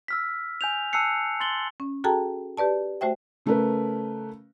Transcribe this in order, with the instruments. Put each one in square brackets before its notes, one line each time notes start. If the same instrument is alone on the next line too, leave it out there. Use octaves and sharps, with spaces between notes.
[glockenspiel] E6 F6 B6
G#5 G6 F7
G#5 A5 E6 F#6 C7 C#7
C6 A6 F#7 G7
[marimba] C#4
F#4 G#4 A4 G5 A5 A#5
G4 B4 D5 A5
A3 F#4 C5 E5 G5
[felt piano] C#3 A3 C#4 A#4 B4